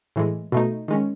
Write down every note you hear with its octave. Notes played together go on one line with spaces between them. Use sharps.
A2 E3 G#3
B2 A3 D#4
D#3 G#3 C#4